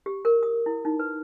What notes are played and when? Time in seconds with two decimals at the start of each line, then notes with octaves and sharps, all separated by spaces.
0.06 G4
0.25 A#4
0.43 D#6
0.66 E4
0.85 D#4
0.99 B4